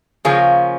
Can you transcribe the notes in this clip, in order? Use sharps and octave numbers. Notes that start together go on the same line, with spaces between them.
C#3 F3 A#3 C#4 G#4